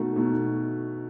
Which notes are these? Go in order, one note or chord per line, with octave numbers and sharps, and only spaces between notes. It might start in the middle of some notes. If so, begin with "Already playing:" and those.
Already playing: B2 A3 D#4 F#4
B2 A3 D#4 F#4